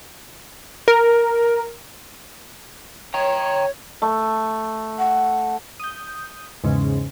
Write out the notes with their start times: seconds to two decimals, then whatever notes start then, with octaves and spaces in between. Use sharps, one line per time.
0.88 A#4
3.14 C#5 G5 A#5
4.02 A3
4.99 F#5
5.80 D#6 G6
6.64 E2 G#2 C#3